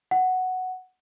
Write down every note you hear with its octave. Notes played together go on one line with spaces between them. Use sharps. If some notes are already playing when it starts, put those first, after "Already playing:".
F#5